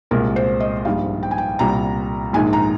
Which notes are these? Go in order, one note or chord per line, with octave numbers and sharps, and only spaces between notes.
C2 A#2 G#3 A#4
C5
D#5
A#1 G#2 D#3 G3 F5
G5
G#5
G5
C2 A#2 G3 A#5
A#1 G#2 D#3 G#3 G#5
A#5